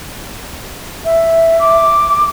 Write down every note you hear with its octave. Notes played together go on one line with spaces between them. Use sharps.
E5
D6